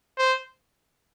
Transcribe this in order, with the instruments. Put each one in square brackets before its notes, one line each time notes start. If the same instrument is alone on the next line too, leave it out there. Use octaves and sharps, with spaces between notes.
[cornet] C5